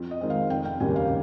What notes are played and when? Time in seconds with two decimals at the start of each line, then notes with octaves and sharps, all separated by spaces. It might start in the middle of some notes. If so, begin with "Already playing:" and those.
Already playing: F2
0.11 D#5
0.21 D#3 G#3 C4
0.30 F5
0.50 F1 G5
0.65 G5
0.80 D#2 C#3 G3 A#3 G#5
0.96 F5